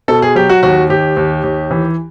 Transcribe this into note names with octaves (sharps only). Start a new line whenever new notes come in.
B2 A4
G#4
F#3 G4
F#4
D#2 F#4
D#2 G4
D#2
D#2
E3